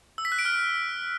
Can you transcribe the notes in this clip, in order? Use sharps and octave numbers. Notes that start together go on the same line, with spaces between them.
E6
B6
F#6
D7
F6